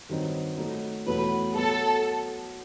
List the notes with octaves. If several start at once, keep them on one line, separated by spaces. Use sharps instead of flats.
G2 D#3 F#3 C4 D#4
F#3 A3 D#4
E2 B2 F#3 A3 B4
F#3 B3 F#4 A4